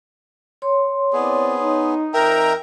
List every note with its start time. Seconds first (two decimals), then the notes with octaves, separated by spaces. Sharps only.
0.62 C#5 C6
1.13 B3 C4 E4 G#4 D5
1.59 D#4
2.14 F2 D#4 A#4 E5 G5 A#5